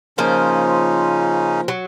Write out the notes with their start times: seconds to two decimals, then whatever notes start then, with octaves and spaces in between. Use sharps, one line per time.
0.18 C#3 F3 A#3 C#4 D#4 C5
1.68 F#3